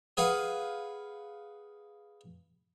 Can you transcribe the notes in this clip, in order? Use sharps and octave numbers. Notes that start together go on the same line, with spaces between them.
G#4 B4 F5 F#5